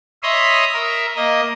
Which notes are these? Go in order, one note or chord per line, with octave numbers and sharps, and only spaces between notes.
C#5 D#5 E5 B5 C6 D#6
A#4 E5
A#3 D#5